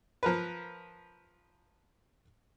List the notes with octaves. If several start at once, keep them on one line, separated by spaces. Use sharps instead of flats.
F3 A#4 B4